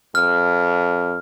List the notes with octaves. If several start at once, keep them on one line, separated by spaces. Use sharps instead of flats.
F2 F6